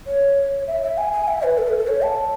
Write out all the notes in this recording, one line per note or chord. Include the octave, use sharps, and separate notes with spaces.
C#5
E5
E5
G#5
G#5
E5
B4
A4
B4
A4
C#5
A5